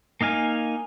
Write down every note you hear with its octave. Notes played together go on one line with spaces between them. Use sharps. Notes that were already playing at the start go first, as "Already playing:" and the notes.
A#3 D#4 F5 G#5